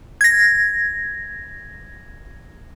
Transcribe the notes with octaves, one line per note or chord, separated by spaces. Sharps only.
G#6 A#6